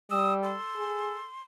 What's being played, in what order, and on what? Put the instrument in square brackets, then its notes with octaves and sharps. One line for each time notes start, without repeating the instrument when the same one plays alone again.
[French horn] G3 [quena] D#6 [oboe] E6
[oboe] A4 [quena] C6
[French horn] G#4